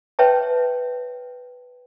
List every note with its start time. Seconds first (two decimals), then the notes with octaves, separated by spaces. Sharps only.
0.19 B4 C#5 E5 G5 A5